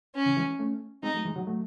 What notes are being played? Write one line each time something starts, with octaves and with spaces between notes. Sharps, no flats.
C#4
C#3 E3
E3 G#3
A3 C#4
G#3 C4 D#4
F#3 A3
E3 G#3
D#3 F#3
F#3 A3